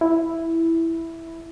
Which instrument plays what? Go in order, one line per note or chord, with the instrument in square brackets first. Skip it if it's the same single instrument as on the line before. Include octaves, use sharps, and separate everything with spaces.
[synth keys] E4